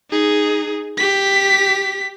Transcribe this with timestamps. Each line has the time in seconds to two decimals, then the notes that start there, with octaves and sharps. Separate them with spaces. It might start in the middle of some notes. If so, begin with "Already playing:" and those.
0.11 D#4 G#4
0.98 G4 B6